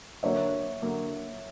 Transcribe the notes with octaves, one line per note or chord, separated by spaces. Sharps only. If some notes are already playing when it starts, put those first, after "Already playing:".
D3 F#3 A#3 C#5 E5
D3 F#3 A#3